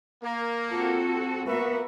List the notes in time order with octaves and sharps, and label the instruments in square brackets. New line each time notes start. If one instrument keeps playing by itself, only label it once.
[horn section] A#3
[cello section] C4 F#4 A4 [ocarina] F4
[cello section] A#3 B3 F#4 [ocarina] A#4 [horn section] B4 C#5 E5